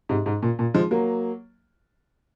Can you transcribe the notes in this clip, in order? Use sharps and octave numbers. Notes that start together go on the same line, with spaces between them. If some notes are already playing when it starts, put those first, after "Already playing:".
G#2 C3
G#2
A#2
A#2
F3 G#3
F#3 A#3